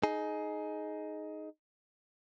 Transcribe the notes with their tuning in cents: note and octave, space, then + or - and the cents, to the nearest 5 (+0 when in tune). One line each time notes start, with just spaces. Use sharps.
D#4 +0 G#4 +20